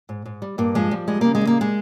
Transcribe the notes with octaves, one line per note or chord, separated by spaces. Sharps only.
G#2
G#2
G3
G2 A#3
F3 G#3
F3 G3
G3 G#3
C#3 A#3
G#3
G3
A#3
G#3